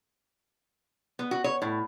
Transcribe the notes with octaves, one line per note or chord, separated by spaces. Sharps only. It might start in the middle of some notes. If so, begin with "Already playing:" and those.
B3
F#4
C#5
A2